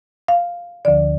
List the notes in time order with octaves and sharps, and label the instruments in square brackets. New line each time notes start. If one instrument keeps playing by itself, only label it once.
[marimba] F5
D2 D3 F3 D5